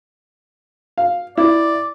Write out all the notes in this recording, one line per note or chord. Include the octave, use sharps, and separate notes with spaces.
F5
E4 D5